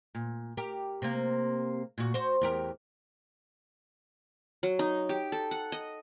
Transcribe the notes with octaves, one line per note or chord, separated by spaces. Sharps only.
A#2
G4 A#4
C3 A#3
A#2 F#4
F#4 C5
E2 G4 A#4
F#3
D#4
G4
A4
F#5
D#5